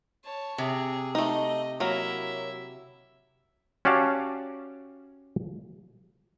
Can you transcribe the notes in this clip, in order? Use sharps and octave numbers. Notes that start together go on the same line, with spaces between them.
C#5 A5
C3 G#4
A3 D#4 D#5
F#3 A#3 E4 E5
C#4 F#4 G4 D5 F5 A5